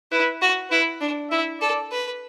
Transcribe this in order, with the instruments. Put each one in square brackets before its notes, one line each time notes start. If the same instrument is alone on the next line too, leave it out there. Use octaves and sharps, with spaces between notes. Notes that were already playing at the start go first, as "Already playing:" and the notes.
[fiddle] E4 [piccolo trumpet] B4
[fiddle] F#4
[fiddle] E4 [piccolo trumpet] B4
[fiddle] D4
[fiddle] E4 [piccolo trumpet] E5
[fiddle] A4 [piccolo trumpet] D5
[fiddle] B4